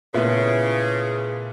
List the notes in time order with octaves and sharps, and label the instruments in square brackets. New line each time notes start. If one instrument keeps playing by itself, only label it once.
[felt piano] A#2 A3 [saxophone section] C#3 [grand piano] B3 E4